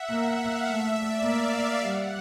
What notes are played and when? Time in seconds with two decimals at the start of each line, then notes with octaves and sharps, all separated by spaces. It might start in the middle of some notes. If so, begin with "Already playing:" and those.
Already playing: E5 F#5
0.12 A#3 F#5
0.40 F5
0.69 A3 E5
0.97 D5
1.25 A#3 F5
1.82 G3 F#5